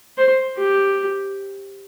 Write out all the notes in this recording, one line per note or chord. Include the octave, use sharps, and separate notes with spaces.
C5
G4